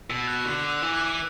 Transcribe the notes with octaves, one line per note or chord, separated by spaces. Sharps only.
B2 E6
F#6
D3 F#6
D6
E6
E3
F#6